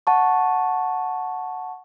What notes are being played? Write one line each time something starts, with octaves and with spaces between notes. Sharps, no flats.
F#5 A5 C#6